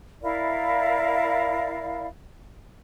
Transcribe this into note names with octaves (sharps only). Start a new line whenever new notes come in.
E4 A#4 D5 F5